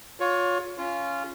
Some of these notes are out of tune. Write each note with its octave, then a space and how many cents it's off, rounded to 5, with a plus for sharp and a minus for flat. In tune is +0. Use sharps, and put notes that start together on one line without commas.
F4 +30 C#5 +15
C#4 +0 F4 -15